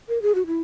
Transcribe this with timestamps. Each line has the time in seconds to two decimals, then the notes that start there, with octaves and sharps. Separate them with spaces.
0.09 A#4
0.22 G#4
0.35 F#4
0.47 E4